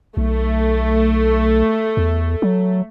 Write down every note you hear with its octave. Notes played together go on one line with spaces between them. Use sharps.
B1 A3
E2
F#3